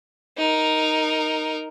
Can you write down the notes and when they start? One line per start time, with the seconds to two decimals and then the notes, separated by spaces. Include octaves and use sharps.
0.38 D#4 A#4